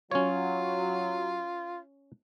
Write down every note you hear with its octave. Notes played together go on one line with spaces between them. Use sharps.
F#3 C#4 F4 C#5